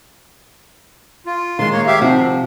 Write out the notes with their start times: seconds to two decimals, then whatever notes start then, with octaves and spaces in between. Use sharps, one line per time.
1.26 F4
1.59 D#3 G#3 C6
1.73 A#3 C#5
1.87 G4 E5 F5
2.01 C3 F3 F#4